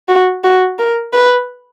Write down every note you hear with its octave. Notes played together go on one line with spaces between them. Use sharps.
F#4
F#4
A#4
B4